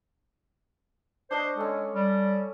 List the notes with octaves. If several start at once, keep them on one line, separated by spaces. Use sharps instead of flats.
D4 C5 D#5 C#6
G#3 C#4 A4
G3